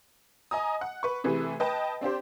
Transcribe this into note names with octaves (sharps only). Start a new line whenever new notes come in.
D#5 G#5 A#5 D#6
F#5
B4 C#6
C3 E3 A3 G#4 B4
B4 D#5 G5 A5
C4 D4 G4 C5